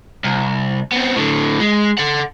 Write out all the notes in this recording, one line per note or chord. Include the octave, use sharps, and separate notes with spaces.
C2
B3 C4
A2 D3
G#3
A4 F#5